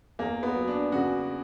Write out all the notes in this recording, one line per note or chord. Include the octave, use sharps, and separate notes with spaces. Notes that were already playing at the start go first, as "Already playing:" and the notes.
E2 A#3
B3
F#3
D4
C#3 F#4